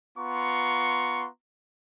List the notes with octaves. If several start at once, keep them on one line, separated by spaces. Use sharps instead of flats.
B3 F4 A#5 C6 C#6